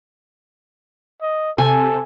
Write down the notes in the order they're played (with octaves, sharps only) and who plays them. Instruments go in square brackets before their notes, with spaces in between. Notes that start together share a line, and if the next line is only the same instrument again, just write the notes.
[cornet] D#5
[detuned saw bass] C3 [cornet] A4 [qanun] G#5